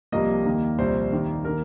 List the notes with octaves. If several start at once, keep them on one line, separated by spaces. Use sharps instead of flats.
C2 C3 F3 A#3 D#5
D#2 D#3 A#3
C2 A#2 F3 C5
D#2 D#3 A#3
D#3 A#3 A#4